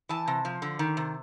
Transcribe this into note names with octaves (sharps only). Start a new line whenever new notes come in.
E3 A5
C3
F3
D3
D#3
C3